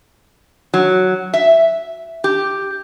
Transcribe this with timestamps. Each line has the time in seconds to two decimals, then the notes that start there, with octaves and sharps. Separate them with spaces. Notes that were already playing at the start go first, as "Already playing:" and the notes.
0.74 F#3
1.33 E5
2.24 G4